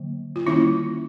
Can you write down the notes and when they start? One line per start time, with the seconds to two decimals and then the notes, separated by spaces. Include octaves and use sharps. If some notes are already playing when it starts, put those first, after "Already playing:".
Already playing: D3 F#3 A#3
0.36 F4
0.46 D#3 G3 A#3 C#4 E4